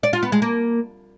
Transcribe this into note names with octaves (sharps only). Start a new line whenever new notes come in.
D5
F4
B3
G#3
A#3